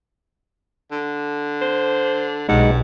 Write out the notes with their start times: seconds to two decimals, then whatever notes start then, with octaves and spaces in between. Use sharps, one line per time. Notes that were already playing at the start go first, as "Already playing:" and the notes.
0.92 D3
1.61 C5
2.49 B1 G2 G#3 D#4 F#5